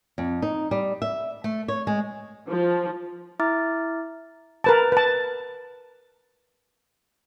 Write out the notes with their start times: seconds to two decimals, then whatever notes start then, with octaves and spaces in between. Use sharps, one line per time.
0.18 F2
0.42 D#4
0.71 G3
1.02 E5
1.44 A3
1.68 C#5
1.87 G#3
2.49 F3
3.40 E4 E5 A#5 D6 F6 A6
4.64 A#4 B4 A5
4.92 B4 A5